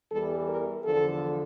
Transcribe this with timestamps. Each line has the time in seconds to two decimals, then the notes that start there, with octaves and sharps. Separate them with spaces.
0.11 E2 E3 G3 A4
0.48 A#4
0.85 E2 D3 F3 A4